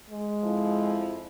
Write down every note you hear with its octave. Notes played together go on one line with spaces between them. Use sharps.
G#3
F2 F3 E4